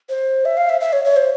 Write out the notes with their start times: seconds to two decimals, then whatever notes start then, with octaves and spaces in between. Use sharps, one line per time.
0.10 C5
0.45 E5
0.57 F5
0.69 E5
0.80 E5
0.93 C#5
1.05 C#5
1.17 C5